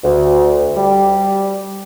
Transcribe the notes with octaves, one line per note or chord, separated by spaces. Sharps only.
D2
G3